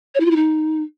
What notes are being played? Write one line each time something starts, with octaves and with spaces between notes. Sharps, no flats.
C#5
E4
F4
E4
D#4